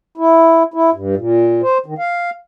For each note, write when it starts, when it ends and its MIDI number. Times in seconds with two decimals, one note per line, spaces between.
0.17 0.63 64
0.74 0.90 64
0.93 1.15 43
1.16 1.61 46
1.62 1.78 72
1.86 1.94 51
1.98 2.30 77